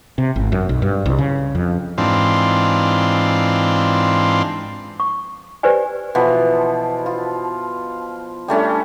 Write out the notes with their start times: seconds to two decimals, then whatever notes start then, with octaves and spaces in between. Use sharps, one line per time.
0.18 C3
0.36 G#1
0.52 F#2
0.69 B1
0.82 G2
1.06 C2
1.18 C#3
1.55 F2
1.98 G#2 E3 C4 D4 F4
5.00 C#6
5.63 G4 B4 C5 D5 G#5
6.15 B2 E3 F3
7.06 F4
8.48 G3 A3 C#4 D4